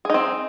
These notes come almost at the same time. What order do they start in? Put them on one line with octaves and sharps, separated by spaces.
G#4 D#4 C4